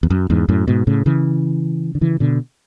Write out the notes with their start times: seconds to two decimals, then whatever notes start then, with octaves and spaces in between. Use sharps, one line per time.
0.03 E2
0.10 F#2
0.30 E2 G#2
0.49 F#2 A2
0.68 G#2 B2
0.87 A2 C#3
1.06 C#3 E3
1.95 D3
2.01 C#3 E3
2.20 B2 D3